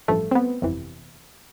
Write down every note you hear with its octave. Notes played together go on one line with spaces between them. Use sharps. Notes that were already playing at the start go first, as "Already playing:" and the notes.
A1 G2 F3 A3
C4
B3
G1 F2 C3 E3